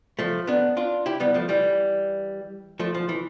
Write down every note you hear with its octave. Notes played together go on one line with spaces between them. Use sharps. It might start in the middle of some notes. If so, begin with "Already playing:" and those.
F3 A3
B3 D4
D4 F4
E4 G4
G3 B3
F3 A3
E3 G3
F3 A3
F3
E3